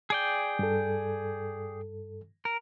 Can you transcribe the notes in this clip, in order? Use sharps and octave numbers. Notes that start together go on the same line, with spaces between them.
G#4 D5 G5
G2 A4
A#4